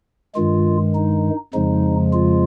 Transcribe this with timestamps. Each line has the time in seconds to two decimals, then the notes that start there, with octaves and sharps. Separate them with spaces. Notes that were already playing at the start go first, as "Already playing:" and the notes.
0.35 G2 D#3 G#3 F4
0.95 D#4
1.54 F2 C#3 F3 G#3 D#4
2.13 F4